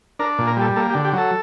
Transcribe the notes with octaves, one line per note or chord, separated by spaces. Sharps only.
D4 A#4
A#2
A#4
G3 A4
A#3 A4
G4
D3
G4
F#3 A4